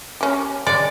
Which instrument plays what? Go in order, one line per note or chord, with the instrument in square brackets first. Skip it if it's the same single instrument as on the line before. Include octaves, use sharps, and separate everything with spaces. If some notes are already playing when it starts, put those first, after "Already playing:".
[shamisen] C#4 G4
[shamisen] G#3 [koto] D5